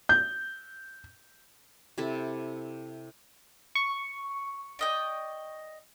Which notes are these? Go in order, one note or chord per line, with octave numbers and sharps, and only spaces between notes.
G6
C3 E4 A4
C#6
D5 D#5 G5